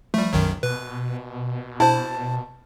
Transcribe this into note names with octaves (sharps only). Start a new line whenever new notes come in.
F3 G3 A3
B1 F#2 D#3 F#3
B2 B4
E4 C5 A5